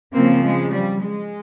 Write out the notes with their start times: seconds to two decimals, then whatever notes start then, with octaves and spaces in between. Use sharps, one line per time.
0.13 C#3 F3 A#3 C4
0.43 G#3
0.71 G3
1.01 G#3